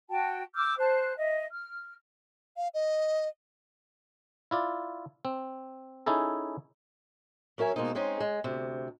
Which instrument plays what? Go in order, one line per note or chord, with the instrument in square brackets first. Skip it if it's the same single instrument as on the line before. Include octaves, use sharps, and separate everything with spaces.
[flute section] F#4 G5 A5
D6 E6 F6 G6
C5 A5 F#6
D#5 E5
F6
[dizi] F5
D#5
[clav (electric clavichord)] E4 F4 D5
C4
C#4 D#4 E4 G#4 A4
[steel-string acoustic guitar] F#3 C#4 A#4 E5 G#5
B2 G#3 A#3 C4 D#4
G#3 C4 C#4 D#4 G#4
G#3
D2 C3